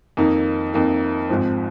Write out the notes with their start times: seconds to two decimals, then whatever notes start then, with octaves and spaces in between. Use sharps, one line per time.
0.17 F2 D#3 A#3 D#4
0.73 F2 D#3 A#3 D#4
1.29 G#1 G#2 F3 C4